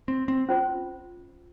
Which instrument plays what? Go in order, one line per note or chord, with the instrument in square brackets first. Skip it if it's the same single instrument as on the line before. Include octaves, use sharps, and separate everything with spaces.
[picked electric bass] C4
C4
[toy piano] C#4 F4 C5